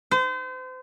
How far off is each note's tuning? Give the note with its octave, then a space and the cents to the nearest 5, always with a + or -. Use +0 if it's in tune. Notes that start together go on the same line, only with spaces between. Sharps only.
C5 -35